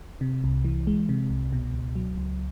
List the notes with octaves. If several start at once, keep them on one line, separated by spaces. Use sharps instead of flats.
C3
C2
E3
G#3
C3
C2
B2
C#2
F#3
C#2